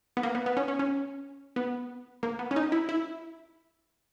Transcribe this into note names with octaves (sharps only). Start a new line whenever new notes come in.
B3
A#3
B3
B3
C#4
C#4
C#4
B3
A#3
B3
C#4
D#4
E4
E4